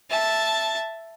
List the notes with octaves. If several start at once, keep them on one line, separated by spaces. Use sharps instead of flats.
E5 A5